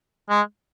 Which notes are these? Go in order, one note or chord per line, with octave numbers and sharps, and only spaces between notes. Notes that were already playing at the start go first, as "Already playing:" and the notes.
G#3